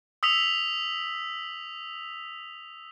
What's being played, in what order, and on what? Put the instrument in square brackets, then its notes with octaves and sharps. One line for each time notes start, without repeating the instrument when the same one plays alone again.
[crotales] D#6 E6 B6 F7